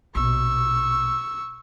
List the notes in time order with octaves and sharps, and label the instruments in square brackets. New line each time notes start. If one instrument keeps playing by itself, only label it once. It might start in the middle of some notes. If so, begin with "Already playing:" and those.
[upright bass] A#1 B2 [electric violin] C#6 E6